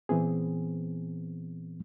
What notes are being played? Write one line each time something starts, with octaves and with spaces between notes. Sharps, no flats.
A#2 E3 B3 C4 G#4